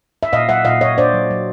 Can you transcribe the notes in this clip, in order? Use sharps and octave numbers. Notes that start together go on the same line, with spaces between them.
E5
A#2 D#5 F5
F#3 E5 F#5
A#2 D#5 F5
A#2 C#5 D#5
D4 C5 D5
F#3
F#3